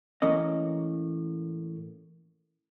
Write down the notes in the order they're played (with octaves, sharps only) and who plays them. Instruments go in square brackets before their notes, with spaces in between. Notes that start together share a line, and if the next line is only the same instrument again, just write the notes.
[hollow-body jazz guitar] A2 E3 A#3 C#4 D#5